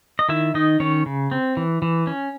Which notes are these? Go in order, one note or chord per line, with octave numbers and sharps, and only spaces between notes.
D#5
D#3 E4 E5
D#3 D#4 D#5
D#3 C#4 C#5
C#3
C4
E3
E3
C#4